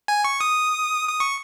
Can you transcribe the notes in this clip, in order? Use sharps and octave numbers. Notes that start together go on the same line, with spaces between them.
G#5
C#6
D#6
D#6
C#6